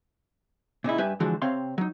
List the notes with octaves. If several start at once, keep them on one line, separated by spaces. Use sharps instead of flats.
A#2 C#3 D#4 E4
G2 G4 B4 E5 G#5
D3 E3 F3 G#3 F#4 A4
C3 C4 C#5 F5 C6
F#3 D#4